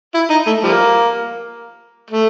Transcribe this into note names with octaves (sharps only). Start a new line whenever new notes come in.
E4
D#4
A3
F3 G3 A#3
A3